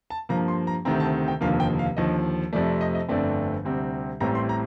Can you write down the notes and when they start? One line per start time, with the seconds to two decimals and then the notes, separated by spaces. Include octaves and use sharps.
0.10 A5
0.29 G2 F3 A#3 A#5
0.48 C6
0.67 A#5
0.85 D2 C3 D#3 A3 C4 A#5
1.00 A5
1.28 G5
1.41 F1 D#2 D3 F3 A#3 F5
1.60 G5
1.79 F5
1.97 D#2 D3 F3 D#5
2.53 F2 C3 F3 A3 D5
2.67 D5
2.81 D#5
2.95 D#5
3.09 G1 F2 D3 A3 C4 D5
3.65 D2 C3 G3 C4
4.20 A1 A2 G3 C4 A#5
4.35 C6
4.49 A#5